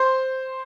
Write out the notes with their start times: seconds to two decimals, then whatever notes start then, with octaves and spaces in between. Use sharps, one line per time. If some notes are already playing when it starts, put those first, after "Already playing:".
Already playing: C5 C6